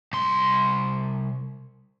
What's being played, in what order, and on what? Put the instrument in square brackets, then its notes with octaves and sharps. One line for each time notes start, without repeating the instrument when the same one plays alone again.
[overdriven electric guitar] C2 C6